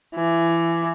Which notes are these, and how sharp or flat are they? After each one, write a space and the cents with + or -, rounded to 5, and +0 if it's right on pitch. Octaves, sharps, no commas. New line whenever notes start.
E3 +25